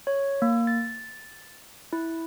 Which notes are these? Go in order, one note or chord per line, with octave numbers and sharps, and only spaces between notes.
C#5
A#3
A6
E4